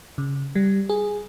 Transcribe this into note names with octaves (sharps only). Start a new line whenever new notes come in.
C#3
G3
G#4